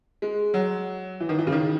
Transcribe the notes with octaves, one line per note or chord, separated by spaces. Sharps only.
G#3
F#3
E3
D#3
E3
C#3
D#3